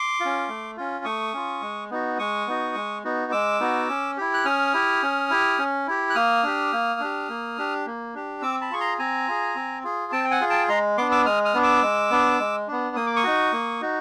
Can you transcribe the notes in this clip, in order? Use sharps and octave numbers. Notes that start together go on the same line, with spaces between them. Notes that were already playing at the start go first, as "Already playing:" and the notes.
Already playing: C6 D6
C#4 F4
A3
C#4 F4
A3 C#6 D#6
C#4 F4
G#3
B3 D#4 F#4
G#3 C#6 D#6
B3 D#4 F#4
G#3
B3 D#4 F#4
G#3 D6 E6
B3 D#4 F#4
C#4
E4 G4
F#6
C#4 D#6 F6
E4 G4
C#4
E4 G4
C#4
E4 G4
F#6
A#3 D#6 F6
D4 G4
A#3
D4 G4
A#3
D4 G4
A#3
D4 G4
C4 D6 E6
A5 B5
F4 G#4 C#6
A#5 C6
C4 G#5 A#5
F4 G#4
C4
F4 G#4
C4 G5 A5
G5
F#5 G#5
F4 G#4
G5 A5
G#3 A#5 C6
B3 D4 C6 D6
D6 E6
G#3 D#6 F6
D#6 F6
B3 D4
D6 E6
G#3
B3 D4
G#3
B3 D4
A#3 D#6
D6
C#6 D#6
D#4 F#4
A#3
D#4 F#4